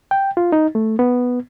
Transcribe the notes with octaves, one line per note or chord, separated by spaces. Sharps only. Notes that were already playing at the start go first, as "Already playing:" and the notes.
G5
F4
D#4
A3
B3